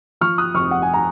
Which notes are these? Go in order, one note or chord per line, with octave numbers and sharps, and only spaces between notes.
F3 C#6 F6
D#6 F#6
F1 C#6 F6
F#5
G#5
A#5